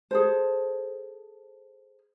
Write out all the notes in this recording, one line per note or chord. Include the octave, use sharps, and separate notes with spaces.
G#4 A4 C5